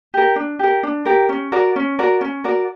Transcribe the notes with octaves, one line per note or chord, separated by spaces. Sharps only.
G4 A#4
D4
G4 A#4
D4
G4 A#4
C#4
F#4 A#4 D5
C#4
F#4 A#4 D5
C#4
F#4 A#4 D5